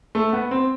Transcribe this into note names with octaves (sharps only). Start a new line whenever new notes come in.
A3
B3
C4